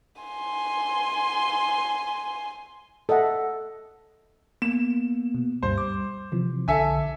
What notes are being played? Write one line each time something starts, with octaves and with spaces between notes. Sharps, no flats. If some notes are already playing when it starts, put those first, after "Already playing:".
G#5 C6
A4 D#5 E5 F#5
A#3 B3 E7
B2
D2 G2 G3 C5
D6
C3 E3 F3
B1 D3 A4 E5 G#5